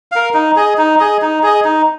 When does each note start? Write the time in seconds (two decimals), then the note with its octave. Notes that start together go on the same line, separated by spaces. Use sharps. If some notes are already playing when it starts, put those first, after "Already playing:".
0.12 A#4 F5
0.34 D#4
0.56 G#4 D#5
0.78 D#4
1.00 G#4 D#5
1.22 D#4
1.43 G#4 D#5
1.65 D#4